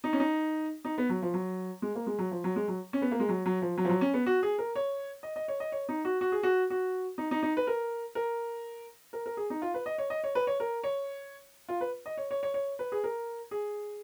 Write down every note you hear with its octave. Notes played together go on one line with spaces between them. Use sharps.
D#4
C#4
D#4
D#4
B3
F#3
F3
F#3
G#3
A#3
G#3
F#3
F3
F#3
G#3
F#3
C#4
B3
A#3
G#3
F#3
F#3
F3
F#3
F3
F#3
C#4
B3
F#4
G#4
A#4
C#5
D#5
D#5
C#5
D#5
C#5
D#4
F#4
F#4
G#4
F#4
F#4
D#4
D#4
D#4
B4
A#4
A#4
A#4
A#4
G#4
D#4
F4
B4
D#5
C#5
D#5
C#5
B4
C#5
A#4
C#5
F4
B4
D#5
C#5
C#5
C#5
C#5
B4
G#4
A#4
G#4